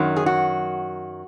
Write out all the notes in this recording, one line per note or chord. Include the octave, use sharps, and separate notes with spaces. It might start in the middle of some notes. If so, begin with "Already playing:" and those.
Already playing: F#2 D#3 F#3
G#4
F#4